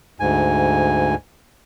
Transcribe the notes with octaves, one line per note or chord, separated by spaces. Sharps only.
D2 G#2 G#5